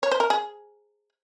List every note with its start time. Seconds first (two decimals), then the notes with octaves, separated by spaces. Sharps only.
0.03 C#5
0.11 C5
0.20 A#4
0.30 G#4